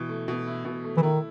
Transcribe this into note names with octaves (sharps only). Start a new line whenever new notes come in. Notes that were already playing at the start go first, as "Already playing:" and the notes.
Already playing: B2 E3
A3
B2
E4
B2
A3
E3
D#3 E4